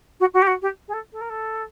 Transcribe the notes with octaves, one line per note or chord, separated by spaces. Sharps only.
F#4
F#4
G4
F#4
G4
G#4
A4
A4
A#4
A4